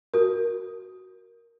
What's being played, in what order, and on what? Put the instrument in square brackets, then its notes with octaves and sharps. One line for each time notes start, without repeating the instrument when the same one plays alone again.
[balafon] F#4 A#4